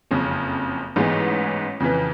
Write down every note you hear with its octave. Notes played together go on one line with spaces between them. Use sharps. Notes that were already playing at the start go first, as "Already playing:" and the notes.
F#1 F2 C#3
A1 G#2 E3 G#3 B3
F2 C#3 E3